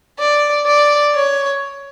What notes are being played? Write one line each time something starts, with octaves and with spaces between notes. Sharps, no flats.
D5
D5
C#5